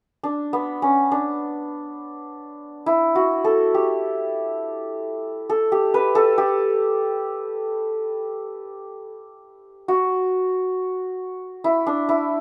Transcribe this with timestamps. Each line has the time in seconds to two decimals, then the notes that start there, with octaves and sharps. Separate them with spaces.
0.23 D4
0.53 B3
0.82 C#4
1.12 D4
2.86 E4
3.15 F#4
3.44 A4
3.74 G4
5.50 A4
5.72 G4
5.94 B4
6.15 A4
6.38 G4
9.88 F#4
11.64 E4
11.87 D4
12.09 E4